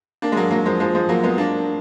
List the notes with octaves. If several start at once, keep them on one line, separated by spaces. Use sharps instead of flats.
A#3 D4
G#3
F#3 A#3
F#3 A#3
F3 G#3
F3 G#3
F3 G#3
F#3 A#3
G#3 B3
A#3 D4